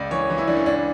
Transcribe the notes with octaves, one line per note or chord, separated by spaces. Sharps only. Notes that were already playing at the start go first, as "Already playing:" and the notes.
Already playing: C#2 D5
E3 C#5
E3
E4
E3 D4
C#4
C#2 D4